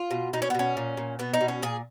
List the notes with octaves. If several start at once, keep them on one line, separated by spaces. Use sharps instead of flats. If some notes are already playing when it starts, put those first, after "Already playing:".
Already playing: F4
B2
B2 D#4
C#4
B3
B2 C#4
A#2
A#2
B2 B3
D#4
B2
C#4
A#2 G#4